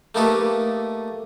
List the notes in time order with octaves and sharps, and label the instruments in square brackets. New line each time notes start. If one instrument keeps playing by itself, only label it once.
[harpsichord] A3 A#3 D#4 G4 A4 B4